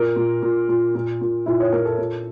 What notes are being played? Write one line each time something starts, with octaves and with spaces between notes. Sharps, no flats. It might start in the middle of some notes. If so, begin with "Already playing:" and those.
Already playing: A#2 A#4
A#2
A#2
A#2
A#2
A#2
A#2 E4
C#5
A#2 A#4
A4
A#2